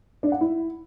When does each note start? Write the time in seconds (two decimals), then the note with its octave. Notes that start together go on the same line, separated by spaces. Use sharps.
0.23 D4
0.32 F#5
0.41 E4